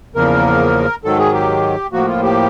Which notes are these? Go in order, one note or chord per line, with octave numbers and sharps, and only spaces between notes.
E2 C#3 F3 A#3 A#4
G#2 D#3 F#3 A4
G#4
G4
A2 F3 A#3 F#4
F4
G4